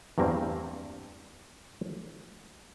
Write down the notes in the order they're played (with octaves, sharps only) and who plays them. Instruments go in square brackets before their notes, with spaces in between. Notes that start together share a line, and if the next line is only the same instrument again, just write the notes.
[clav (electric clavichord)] E2 G2 A3 A#3 C4